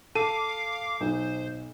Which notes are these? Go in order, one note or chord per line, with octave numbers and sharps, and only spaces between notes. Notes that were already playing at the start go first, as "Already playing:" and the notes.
A4 F5 D6 D#7
B1 C5